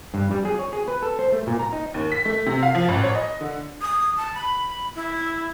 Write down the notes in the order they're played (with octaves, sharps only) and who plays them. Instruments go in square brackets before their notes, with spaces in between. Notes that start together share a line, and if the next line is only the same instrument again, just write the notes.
[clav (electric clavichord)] G2
G3
G#4
C#5
G#4
B4
A4
C5
A3
A#2
A#5
D#4
[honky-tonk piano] D#2
B6
A3
C3
F5
F3
A1
C#5
D#5
D3
[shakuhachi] D#6
A5
B5
E4